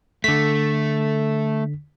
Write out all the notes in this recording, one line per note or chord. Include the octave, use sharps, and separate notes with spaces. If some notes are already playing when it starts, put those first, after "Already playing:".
D3 A3 B6